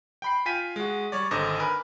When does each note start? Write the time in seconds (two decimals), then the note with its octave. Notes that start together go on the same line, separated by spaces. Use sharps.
0.22 G5 B5 C7
0.46 F4 G5 G#5 B6 D#7
0.76 G#3 F#4
1.12 G3 C#5 D5
1.31 G#1 D3 C5 D#5 A#5 D6
1.60 A#4 B4 G#5